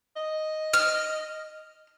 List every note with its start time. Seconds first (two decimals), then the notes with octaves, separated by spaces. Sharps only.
0.16 D#5
0.73 F6